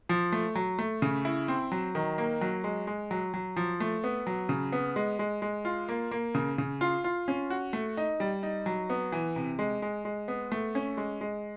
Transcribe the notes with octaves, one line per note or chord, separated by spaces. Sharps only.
F3
A3
F#3
A3
C#3
E4
C4
F#3
D#3
A#3
F#3
G#3
G#3
F#3
F#3
F3
A3
B3
F#3
C#3
B3
G#3
G#3
G#3
F4
A#3
A#3
C#3
C#3
F4
F4
C#4
F#4
A3
D#4
G3
D#4
F#3
B3
E3
C3
G#3
G#3
G#3
B3
A3
C#4
G#3
G#3